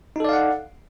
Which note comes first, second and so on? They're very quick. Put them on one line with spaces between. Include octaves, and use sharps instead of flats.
D#4 A4 D5 F5 F#5